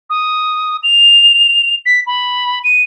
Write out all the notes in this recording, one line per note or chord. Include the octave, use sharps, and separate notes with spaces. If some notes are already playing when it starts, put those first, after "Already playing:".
D#6
F7
B6
B5
D#7